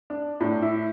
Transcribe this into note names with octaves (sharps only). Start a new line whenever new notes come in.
D4
A2 D4
E4